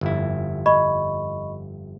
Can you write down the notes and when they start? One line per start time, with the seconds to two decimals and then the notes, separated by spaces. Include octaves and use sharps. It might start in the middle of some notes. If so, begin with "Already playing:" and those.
0.01 G1 F2 E4
0.66 D#5 B5 C#6